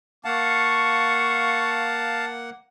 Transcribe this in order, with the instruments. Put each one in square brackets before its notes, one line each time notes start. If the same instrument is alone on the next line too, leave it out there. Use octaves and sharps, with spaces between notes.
[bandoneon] A#3 F#5 [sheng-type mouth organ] F5 A5 [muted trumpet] C#6